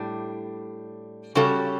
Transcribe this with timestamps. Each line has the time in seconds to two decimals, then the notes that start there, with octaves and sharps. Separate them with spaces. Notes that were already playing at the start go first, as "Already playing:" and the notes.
Already playing: A2 G3 D4
1.35 C#3 G3 C#4 F#4 A4